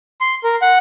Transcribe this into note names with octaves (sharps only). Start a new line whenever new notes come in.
C6
A#4
F#5